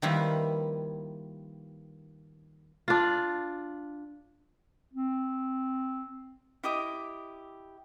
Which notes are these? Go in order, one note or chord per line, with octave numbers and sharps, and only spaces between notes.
D#3 F3 G3 A#3 E4 B4
D4 F4
C4
E4 G4 D#5 D6